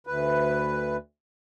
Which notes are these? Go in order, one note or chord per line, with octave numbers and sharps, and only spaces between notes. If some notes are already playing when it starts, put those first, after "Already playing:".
D2 B4